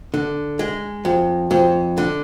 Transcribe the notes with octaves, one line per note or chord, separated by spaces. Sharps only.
D3
G#3
F2
F2
D3